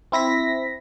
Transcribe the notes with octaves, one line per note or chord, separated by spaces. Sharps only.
C4 E4 A#6 B6